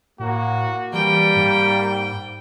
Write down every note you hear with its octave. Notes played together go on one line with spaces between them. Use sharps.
A2 A#3 F#4
E3 G3 A#3 G5
G#2